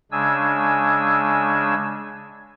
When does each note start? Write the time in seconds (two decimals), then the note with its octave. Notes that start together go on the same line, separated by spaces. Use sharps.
0.12 C#3 G#3 D4 G#5 E6